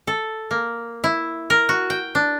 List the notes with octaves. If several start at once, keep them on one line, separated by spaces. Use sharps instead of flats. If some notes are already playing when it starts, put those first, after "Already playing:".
A4
A#3
E4
A#4
F#4
G5
D4